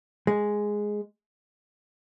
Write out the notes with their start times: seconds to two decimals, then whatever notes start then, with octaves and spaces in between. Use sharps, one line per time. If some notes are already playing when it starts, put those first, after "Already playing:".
0.27 G#3